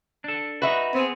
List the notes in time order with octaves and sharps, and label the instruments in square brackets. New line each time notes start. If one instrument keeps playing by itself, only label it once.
[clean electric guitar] D4 A4
[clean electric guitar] D#4 F#4 [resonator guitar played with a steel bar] B4 E5
[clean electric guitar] B3 G#4 [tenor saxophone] C4